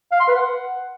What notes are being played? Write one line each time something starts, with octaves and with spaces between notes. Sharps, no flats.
F5
C6
B4
F#5